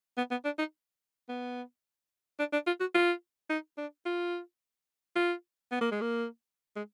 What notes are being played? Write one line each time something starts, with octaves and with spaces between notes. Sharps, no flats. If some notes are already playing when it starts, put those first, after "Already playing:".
B3
B3
D4
D#4
B3
D4
D4
F4
F#4
F4
D#4
D4
F4
F4
B3
A#3
G#3
A#3
G#3